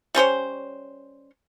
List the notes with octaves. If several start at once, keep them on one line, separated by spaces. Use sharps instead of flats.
G3 C#4 C5 C#5